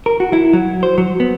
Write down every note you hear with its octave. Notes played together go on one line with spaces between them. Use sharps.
A#4
F#4
E4
F#3
C5
F#3
B3